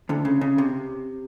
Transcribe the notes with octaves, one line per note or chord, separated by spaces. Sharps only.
D2 D3
C#3
C#3
C3